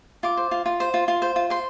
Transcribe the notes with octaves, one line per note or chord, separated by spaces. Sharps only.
F4 D6
C5
F4
F4
C5
F4
F4
C5
F4
C5 C6